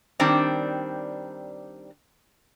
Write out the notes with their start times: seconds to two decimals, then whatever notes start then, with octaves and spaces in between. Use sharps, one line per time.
0.20 D#3 G3 C4 D4